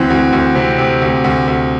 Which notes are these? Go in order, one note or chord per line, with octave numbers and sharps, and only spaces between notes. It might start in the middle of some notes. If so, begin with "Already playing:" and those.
Already playing: D2 E3 C4
D2
D2
C3
C3
D2
D2
D2